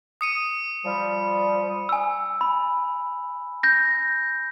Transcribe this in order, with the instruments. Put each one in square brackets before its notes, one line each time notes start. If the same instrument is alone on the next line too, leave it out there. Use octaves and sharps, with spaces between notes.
[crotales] D#6 C#7 D#7
[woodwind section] F3 G3
[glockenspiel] G#5 E6
B5
G6 A#6